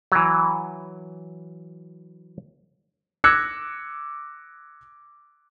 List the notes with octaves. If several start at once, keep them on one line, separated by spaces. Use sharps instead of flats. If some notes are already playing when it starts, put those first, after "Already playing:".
E3 F#3
D6 E6 F#6 G#6 A#6 C#7